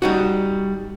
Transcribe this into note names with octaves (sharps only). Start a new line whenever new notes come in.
G3 D#4 F#4